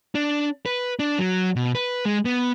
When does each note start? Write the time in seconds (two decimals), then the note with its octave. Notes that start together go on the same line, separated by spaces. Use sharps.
0.15 D4
0.66 B4
0.99 D4
1.19 F#3
1.56 B2
1.75 B4
2.05 G#3
2.25 B3